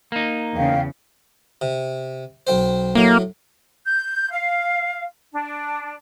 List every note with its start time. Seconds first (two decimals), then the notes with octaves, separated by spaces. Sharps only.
0.12 A#3 D#4
0.56 E2 C#3 F5 G5
1.61 C3
2.47 B1 C4 C5
2.95 A2 F#3 A#3
3.85 G6
4.30 F5
5.32 D4